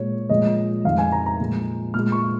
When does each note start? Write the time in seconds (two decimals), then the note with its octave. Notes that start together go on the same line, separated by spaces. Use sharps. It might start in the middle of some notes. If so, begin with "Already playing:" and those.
Already playing: A#2 G#3 C#5
0.29 A#2 F3 G#3 D#5
0.84 F2 D#3 G#3 F5
0.98 G#5
1.12 A#5
1.26 A#5
1.40 A#2 F3 G#3
1.94 A#2 G#3 F6
2.12 C#6